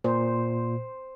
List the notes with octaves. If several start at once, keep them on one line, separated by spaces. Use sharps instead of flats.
A#2 C5